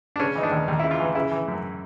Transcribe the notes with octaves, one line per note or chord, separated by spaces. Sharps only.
D4
C#3 C#4
E3 D#4
D4
D#2
D#2
C#3 E4
F4
E3
C#3 E4
E3
F#2